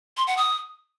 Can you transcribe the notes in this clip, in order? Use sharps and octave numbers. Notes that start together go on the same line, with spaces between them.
C6
F#5
D#6